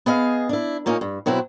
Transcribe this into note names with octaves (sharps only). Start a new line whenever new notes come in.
B3 G#4 D#5 F5
D4 E4
A#2 A#3 C#4 D#4
G2
B2 F#3 C4 E4 B4